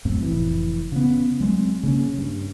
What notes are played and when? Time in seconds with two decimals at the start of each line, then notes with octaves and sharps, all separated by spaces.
0.05 F2 A2 F#3 C4
0.22 F1 E3
0.92 C#3 B3
1.40 F#3 G#3 B3 C4
1.83 C#3 A#3 C#4
2.18 G2